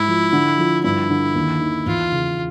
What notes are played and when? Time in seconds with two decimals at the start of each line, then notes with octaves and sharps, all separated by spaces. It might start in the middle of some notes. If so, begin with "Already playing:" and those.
Already playing: G#2 E4
0.08 F3
0.32 D3
0.58 F3
0.84 G2 E4
1.10 D3
1.35 D#2
1.60 D#3
1.86 E2 F4
2.12 C#3